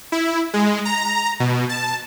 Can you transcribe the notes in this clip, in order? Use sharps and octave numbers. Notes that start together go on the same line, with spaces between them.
E4
G#3
A#5
B2
A5